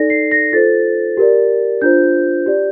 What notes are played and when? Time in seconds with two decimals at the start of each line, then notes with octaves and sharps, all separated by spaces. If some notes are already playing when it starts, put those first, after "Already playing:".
Already playing: D#4 A4 D5 A#6
0.10 C7
0.32 A#6
0.52 F4 A4 C5 A6
1.17 G4 A#4 D5
1.82 D4 F4 C5 G6
2.46 G4 D5